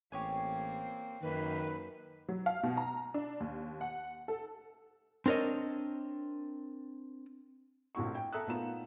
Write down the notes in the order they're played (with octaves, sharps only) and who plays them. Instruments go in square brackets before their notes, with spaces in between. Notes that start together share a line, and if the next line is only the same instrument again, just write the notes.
[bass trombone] A1 [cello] A#3 C4 [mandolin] G4 C#5 G#5
[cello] F#2 A#3 [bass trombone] D#3 [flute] B4
[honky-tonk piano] F#3
F5
B2
A#5
D4
D#2
F#5
A4
[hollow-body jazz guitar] C4 D4 A#4 C#5 D#5
[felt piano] A#1 A2 C4 E4 F#4 C#6
G5
A4 E5 A#5 D#6 E6 F#6
A#2 A3 B3 D#4 F4 E7